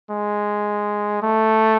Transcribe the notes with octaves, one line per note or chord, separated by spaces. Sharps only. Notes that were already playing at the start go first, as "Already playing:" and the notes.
G#3
A3